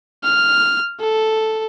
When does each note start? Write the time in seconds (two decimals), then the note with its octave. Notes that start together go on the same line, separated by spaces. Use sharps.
0.23 F6
1.00 A4